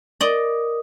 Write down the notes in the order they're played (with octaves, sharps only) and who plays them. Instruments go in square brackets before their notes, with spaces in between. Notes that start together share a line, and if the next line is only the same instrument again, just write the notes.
[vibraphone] A#4 D#6 [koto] D5 D#5